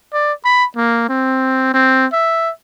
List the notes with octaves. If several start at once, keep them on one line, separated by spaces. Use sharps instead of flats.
D5
B5
A#3
C4
C4
E5